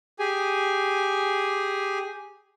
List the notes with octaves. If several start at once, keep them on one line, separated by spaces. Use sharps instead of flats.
G4 G#4 G#5